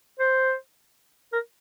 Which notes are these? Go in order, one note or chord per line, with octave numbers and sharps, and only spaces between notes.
C5
A#4